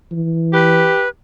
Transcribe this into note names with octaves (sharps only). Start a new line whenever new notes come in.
E3
G4 B4